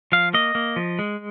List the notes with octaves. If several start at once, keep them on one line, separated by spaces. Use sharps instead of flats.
F3 F5
A#3 D#5
A#3
F3
G#3